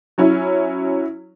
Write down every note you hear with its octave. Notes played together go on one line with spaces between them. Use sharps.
F#3 C#4 E4